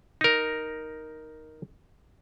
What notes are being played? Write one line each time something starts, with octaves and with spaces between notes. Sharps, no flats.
D#4 A#4